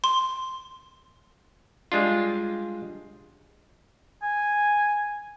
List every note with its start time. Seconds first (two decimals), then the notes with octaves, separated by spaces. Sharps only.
0.04 C6
1.92 G3 G#3 D4 F4
4.22 G#5